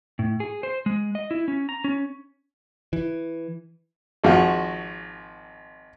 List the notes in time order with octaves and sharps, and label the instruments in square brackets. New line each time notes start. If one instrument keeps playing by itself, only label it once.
[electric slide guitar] A2
G#4
C5
G#3
D#5
E4
C#4
A#5
C#4
[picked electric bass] E3
[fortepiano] G#1 F3 G#3 F#4